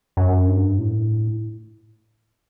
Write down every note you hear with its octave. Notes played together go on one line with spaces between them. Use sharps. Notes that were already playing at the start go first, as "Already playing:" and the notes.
F#2
G2
A2